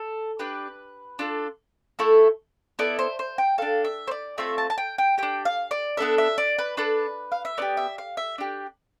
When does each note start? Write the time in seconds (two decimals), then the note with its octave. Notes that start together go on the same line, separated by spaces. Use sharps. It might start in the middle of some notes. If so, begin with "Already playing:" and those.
Already playing: A4
0.39 D4 G4 B4
1.19 D4 F4 A4
1.99 A3 E4 A4
2.79 B3 E4 A4 D5
2.99 C5
3.19 C5
3.38 G5
3.58 D4 A4 F5
3.85 E5
4.07 C5
4.11 D5
4.38 A3 C4 F4 A4 E5
4.58 A5
4.70 A5
4.78 G5
4.98 G5
5.18 D4 G4 G5
5.45 F5
5.71 D5
5.97 B3 D4 A4 E5
6.18 E5
6.38 D5
6.58 B4
6.77 D4 A4 B4
7.32 F5
7.45 E5
7.58 B3 D4 D5
7.62 G4
7.77 E5
7.98 F5
8.17 E5
8.38 D4 G4